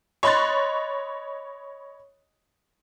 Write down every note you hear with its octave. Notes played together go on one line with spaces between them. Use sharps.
C#5 D#5 B5 C6 F#6 A6